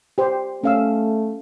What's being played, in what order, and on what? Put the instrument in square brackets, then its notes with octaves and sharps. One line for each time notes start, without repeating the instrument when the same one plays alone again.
[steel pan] G4 C5
[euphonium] A3 [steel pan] C#4 F5 E6